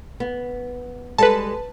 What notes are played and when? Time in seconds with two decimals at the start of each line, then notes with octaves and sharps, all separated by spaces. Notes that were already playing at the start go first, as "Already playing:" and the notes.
0.20 B3
1.18 G3 G#3 A4 B4 A5